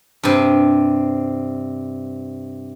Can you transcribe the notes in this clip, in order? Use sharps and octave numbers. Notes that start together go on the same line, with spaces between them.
G2 C3